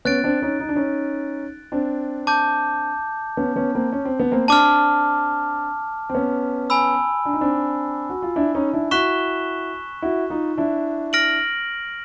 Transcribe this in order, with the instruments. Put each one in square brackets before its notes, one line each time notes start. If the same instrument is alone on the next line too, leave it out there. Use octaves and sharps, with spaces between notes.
[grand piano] B3 C#4 [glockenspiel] F#6 A6 D7
[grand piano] C4 D4
C#4 D#4
D#4
D4
C#4 D#4
C4 D4
[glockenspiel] A5 D6 G6
[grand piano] B3 C#4
B3 C#4
A#3 C4
C#4
C4
B3
A#3 C4
[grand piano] C4 D4 [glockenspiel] A5 D6 F6
[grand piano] C4
B3 C#4
[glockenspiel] G#5 B5 E6
[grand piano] D4
D#4
C4 D4
F#4
F4
D4 E4
C#4 D#4
D4 E4
[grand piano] E4 F#4 [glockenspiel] C#6 F#6 B6 E7 G7
[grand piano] E4 F#4
D#4 F4
D4 E4
[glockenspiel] F6 A#6 D7 F#7